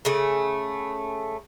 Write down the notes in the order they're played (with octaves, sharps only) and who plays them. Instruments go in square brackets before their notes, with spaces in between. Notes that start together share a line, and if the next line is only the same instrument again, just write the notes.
[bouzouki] C#3 A3